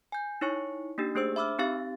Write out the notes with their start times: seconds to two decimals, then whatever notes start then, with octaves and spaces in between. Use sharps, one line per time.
0.12 G#5 G6
0.41 D#4 E4 C#5 C#6 C#7
0.98 A#3 D4 D#4 G4
1.15 A3 D4 G#4 C5 E6
1.36 E5 B5 D6 E6 F6
1.59 C4 D#4 G4 F5 A6